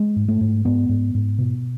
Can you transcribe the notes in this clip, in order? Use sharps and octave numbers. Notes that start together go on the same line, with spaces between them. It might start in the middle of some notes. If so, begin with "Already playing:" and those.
Already playing: G#3
G#2
A3
G#2
G#2 B3
G#2
G#2
B2